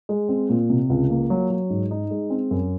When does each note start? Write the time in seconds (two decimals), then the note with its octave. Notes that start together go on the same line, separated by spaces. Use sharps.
0.09 G#3
0.29 C4
0.49 A#2
0.70 C3
0.90 C#2
1.10 A#3
1.30 F#3
1.50 F#3
1.70 G#2
1.91 D#4
2.11 G#3
2.30 C4
2.51 F#2